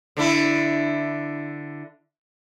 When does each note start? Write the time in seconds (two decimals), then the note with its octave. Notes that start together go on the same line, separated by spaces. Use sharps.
0.17 D3 D4 E4